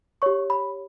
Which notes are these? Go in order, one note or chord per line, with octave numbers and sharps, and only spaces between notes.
G4 C#5 C#6
B5